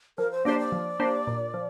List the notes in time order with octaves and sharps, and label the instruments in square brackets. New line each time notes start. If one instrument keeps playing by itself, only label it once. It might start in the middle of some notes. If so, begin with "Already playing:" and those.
[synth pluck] F3 [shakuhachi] A#4
[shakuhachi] C5
[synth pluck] A#3 D4 G4 C5 [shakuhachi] D5
[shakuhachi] D5
[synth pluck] F3
A#3 D4 G4 C5
A#2
F3